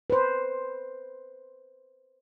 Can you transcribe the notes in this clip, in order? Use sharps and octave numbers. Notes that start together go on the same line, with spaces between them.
B4 C5